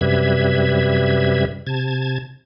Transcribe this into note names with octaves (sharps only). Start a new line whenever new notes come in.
F#2 C3 G3 B4 E5 G#6
C3 A5 G#6